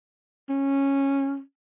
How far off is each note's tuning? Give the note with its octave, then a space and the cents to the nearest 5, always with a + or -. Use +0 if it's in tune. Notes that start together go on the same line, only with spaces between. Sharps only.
C#4 -10